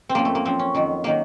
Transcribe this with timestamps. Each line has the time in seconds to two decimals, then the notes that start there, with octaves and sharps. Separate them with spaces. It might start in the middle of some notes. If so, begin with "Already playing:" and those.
0.09 C4
0.15 F#2 F3 A#3
0.25 A3
0.35 A#3
0.45 F#2 F3 C4
0.59 C#4
0.74 F2 D#3 F#3
1.04 D#3 F#3 A#3